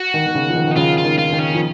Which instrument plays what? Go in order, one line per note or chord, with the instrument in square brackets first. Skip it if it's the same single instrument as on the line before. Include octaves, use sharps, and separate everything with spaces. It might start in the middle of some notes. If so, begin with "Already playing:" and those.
Already playing: [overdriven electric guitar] F#4
[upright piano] D#3
D#3
C#3
F3
D#3
[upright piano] D#3 [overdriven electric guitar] D#4
[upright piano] C#3 [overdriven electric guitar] F4
[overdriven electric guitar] F4
[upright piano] D#3
[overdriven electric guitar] F4
[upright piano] D#3
[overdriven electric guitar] C#4
[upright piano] F3